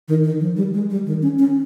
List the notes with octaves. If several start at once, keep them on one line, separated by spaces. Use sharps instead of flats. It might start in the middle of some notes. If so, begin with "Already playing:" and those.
D#3
D#3
F3
G3
G#3
G3
D#3
C#4
C#4